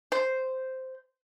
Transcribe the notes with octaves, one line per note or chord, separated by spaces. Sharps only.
C5